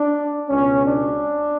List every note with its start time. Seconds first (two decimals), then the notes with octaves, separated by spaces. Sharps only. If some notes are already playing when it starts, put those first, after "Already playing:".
Already playing: D4
0.49 C#2 B2 C#4
0.86 D4